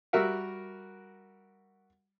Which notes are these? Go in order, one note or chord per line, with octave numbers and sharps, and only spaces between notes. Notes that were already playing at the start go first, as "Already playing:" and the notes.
G3 F#4 A#4 E5 F#5